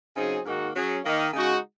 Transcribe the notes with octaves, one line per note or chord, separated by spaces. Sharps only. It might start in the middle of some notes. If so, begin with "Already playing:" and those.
C#3 F#3 C4 D#4 G#4
G#2 D#3 A#3 D#4 F#4
F#3 C#4 G#4
D#3 A#3 D#4
C#3 G#3 D#4 F#4